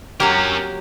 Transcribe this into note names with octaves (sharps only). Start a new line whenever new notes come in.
F#3 A#3 C#4 G4 A#4